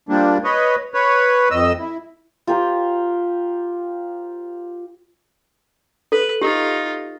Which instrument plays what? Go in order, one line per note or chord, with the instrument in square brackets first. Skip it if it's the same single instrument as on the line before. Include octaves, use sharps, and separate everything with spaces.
[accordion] F3 G3 A#3 D4
B4 C#5 D#5
B4 C#5
F2 D#5 E6
E4
[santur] F4 G4 A#4 C5
[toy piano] A4 [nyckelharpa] B4
[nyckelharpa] D#4 F4 [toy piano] G4